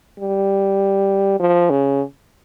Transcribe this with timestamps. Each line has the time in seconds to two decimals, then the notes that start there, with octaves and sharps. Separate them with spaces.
0.20 G3
1.40 F3
1.70 C#3